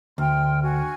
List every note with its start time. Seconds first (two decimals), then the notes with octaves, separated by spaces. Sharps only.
0.18 D2 G5 C6 F6
0.61 F#4 G#5